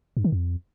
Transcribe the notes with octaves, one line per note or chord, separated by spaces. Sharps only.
G2
D#3
F2